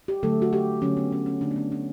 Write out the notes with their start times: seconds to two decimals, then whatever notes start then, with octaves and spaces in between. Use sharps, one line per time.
0.08 G4
0.23 D3 F#3 A3 A4
0.42 F#4
0.53 G4
0.82 D3 F#3 A3 C#4
0.97 B3
1.12 C#4
1.26 C#4
1.41 D3 F#3 A3 D4
1.51 B3
1.56 C#4
1.72 C#4